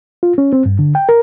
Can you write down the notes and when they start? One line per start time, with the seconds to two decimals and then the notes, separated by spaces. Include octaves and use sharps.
0.23 F4
0.38 C#4
0.53 C4
0.66 G2
0.79 D3
0.95 G5
1.09 A#4